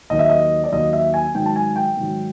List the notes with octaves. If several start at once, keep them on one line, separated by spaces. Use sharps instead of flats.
D#2 D#3 F#3 D#5
E5
D#5
D5
D#2 D#3 F#3 D#5
E5
G#5
G#2 D#3 F#3 G5
A5
G#5
G5
G#2 D#3 F#3